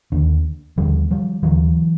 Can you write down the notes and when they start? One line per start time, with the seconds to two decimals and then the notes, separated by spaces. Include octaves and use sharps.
0.12 D#2 D3
0.78 D#2 D3 F3 G3
1.11 F3 G3
1.43 D#2 D3 E3 F#3